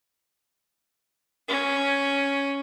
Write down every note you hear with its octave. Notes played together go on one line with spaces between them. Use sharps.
C#4